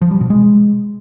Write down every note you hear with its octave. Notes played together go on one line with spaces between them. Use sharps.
F3
G3
B2
G#3